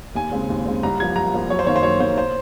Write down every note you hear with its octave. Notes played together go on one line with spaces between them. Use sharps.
D#2 G#5
C#3 G#3 C4
D#2
C#3 G#3 C4
C2 A#5
C3 F3 A#3 G#6
C2 A#5
C3 F3 A#3
F#2 C#5
C5
D#3 A#3 C#5
C5
F#2 C#5
D#3 A#3 C5
C5